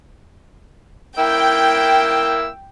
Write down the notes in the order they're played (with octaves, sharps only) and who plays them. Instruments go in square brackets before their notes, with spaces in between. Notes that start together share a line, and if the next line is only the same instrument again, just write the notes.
[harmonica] A#3 E4 E6 [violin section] G5